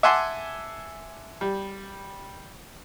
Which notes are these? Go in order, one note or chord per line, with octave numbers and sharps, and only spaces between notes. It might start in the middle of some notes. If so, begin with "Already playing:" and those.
E5 F#5 G#5 A5 C6 D6
G3